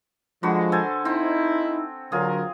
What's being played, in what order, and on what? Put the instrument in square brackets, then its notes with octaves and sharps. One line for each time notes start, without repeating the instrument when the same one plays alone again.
[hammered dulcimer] D3 F#4 B5 [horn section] F3 G#3
[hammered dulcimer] A4 C5 G#5
[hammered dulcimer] C4 [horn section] D#4 E4
[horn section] D3 F#3 A#4 [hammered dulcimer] F4 G#4